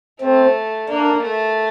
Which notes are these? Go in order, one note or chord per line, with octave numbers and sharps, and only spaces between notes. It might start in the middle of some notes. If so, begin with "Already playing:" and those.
A3 C4
A#3 D4
A3